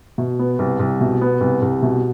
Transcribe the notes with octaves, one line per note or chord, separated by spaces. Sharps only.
B2
B3
C2
C2
B2
B3
C2
C2
B2